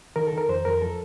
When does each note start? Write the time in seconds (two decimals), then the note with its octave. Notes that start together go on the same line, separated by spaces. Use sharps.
0.16 D#3 A#4
0.27 A4
0.33 D#3 A#4
0.49 F2 C5
0.65 F2 A#4
0.82 F3 A4